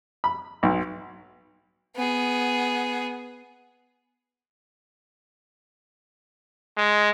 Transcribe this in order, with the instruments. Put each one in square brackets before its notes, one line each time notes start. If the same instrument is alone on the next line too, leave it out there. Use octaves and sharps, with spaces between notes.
[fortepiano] B5
B1
[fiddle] B3 G#4
[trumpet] G#3